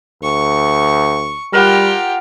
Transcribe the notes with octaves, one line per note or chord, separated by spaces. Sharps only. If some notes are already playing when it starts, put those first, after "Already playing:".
D2 C#6
G3 F4 G4 A#4 F#5 G5